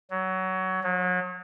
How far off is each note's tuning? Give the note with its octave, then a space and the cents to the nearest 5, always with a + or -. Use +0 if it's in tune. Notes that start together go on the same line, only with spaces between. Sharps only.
F#3 +20
F#3 -35